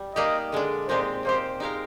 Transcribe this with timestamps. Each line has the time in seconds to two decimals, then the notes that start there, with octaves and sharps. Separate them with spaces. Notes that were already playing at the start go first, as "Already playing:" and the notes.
Already playing: G3
0.15 A#3 D#4 G4 D5 D#5
0.52 D3 G#3 D4
0.88 A#2 G#3 C4 D#4 G4 C5
1.25 A#3 D#4 G4 C5
1.60 G#3 D#4 G4 A#4 F5